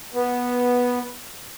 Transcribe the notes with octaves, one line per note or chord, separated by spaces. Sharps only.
B3